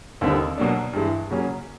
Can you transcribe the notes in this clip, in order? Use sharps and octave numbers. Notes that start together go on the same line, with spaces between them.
D#2 D3 G3 C4 D#4
B2 F#3 A#3 D4
G2 E3 G#3
C#3 F#3 A#3 C#4